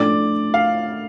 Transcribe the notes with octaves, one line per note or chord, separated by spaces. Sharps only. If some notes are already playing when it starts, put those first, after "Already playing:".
Already playing: A2 F3 D4 A4 D5
F5